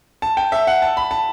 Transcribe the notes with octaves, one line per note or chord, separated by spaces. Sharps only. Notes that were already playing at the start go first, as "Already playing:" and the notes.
A5
G5
E5
F#5
A5
B5
A5